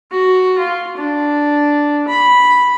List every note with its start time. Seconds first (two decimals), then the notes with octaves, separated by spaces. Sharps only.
0.11 F#4
0.58 F4
0.97 D4
2.08 B5